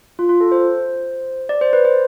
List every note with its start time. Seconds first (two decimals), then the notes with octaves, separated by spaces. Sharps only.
0.19 F4
0.29 F4
0.41 A4
0.52 C5
1.49 D5
1.61 C5
1.73 B4
1.85 C5